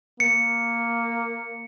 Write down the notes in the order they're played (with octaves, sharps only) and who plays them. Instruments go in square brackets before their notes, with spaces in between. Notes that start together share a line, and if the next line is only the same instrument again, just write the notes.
[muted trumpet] A#3 [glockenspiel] C#7